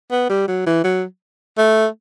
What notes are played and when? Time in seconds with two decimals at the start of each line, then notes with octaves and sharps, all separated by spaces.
0.11 B3
0.30 G3
0.48 F#3
0.66 E3
0.84 F#3
1.58 A3